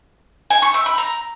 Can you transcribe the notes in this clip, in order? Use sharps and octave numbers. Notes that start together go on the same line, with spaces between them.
G#5
C#6
E5
B5
A#5